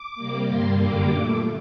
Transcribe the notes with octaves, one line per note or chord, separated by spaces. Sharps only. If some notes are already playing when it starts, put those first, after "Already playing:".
Already playing: D6
C3 G3 A#3
G2 D3 G3 A#3 C6
F#2 D3 G3 A#3 D6
A#2 A3